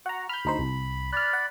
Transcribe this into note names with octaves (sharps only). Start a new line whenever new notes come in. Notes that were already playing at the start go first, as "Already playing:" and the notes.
F#4 F#5 A#5
B5 F6 G6
D2 D#4 C5
C2
D5 B5 F6 F#6
F#5